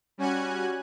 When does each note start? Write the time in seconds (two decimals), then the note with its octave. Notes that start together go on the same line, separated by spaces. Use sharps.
0.18 G3 C#4 F#4 G#5 F#6 G#6